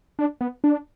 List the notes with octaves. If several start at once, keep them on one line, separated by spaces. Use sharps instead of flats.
D4
B3
D4